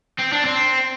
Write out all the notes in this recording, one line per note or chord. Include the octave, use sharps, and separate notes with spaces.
C4
D4
C4